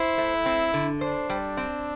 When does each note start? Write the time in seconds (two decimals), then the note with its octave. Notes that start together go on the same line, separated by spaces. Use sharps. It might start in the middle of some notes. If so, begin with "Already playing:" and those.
Already playing: E4 C5
0.18 A3
0.46 C4
0.74 D3
1.01 D4 C5
1.30 G3
1.57 C4